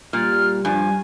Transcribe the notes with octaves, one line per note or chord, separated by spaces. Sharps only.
A#2 G3 F6
G2 F3 G#5